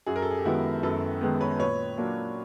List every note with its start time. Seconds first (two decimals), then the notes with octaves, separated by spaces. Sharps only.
0.06 F#2 F#4 G#4
0.16 A#4
0.22 A4
0.31 G#4
0.38 G4
0.45 D#3 G#3 B3 E4 F#4
0.83 F#2 A4 B4
1.21 D#3 G#3 B3
1.41 B4 C#5
1.59 A#2 B4 C#5
1.98 F#3 A#3 D4 F4